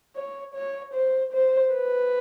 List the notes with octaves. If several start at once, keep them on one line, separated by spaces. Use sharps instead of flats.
C#5
C#5
C5
C5
B4